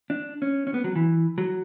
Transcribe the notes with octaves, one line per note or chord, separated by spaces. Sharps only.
D4
C#4
C#4
B3
F#3
E3
F#3